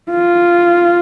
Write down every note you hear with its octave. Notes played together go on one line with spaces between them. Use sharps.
F4